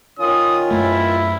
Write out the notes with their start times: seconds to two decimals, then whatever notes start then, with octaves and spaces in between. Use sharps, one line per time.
0.19 D#3 C#4 F4 D#6
0.71 F#2 A3 E4